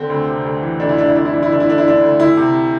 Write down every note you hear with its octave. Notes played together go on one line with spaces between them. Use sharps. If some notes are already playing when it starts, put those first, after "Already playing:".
Already playing: D3 C4
D2
C3
D2
E3
D2 D4
E4
C3 D4
E4
D2 D4
E4
E3 D4
E4
D2 D4
E4
D3 D4
E4
D3 D4
D2
D2 E4
C3